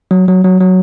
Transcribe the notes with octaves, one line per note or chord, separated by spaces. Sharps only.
F#3
F#3
F#3
F#3